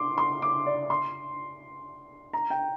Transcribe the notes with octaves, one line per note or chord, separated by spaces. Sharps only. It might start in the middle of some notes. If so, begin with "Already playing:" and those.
Already playing: C6 D6
C6
D6
D5
C6
A#5
G5